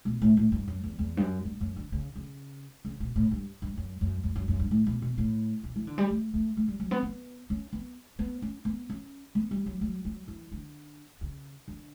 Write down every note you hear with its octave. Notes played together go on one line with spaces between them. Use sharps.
B2
A2
A2
G2
F#2
E2
E2
G2
F#2
G2
F#2
D3
C#3
C#3
C#3
B2
A2
G2
G2
F#2
F#2
F#2
F#2
F#2
G2
A2
B2
B2
A2
B2
E3
D3
G3
A3
A3
A3
G3
F#3
B3
B3
C#4
B3
B3
C#4
B3
C#4
B3
G3
F#3
F#3
F#3
E3
D3
C#3
D3